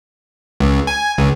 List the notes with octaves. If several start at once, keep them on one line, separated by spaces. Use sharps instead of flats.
C#2
G#5
C#2